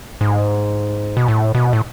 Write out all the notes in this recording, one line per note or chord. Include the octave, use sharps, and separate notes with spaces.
G#2
B2
A2
B2
A2